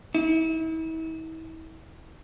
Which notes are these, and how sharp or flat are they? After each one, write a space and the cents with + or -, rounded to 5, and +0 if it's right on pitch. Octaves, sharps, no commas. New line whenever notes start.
E4 -40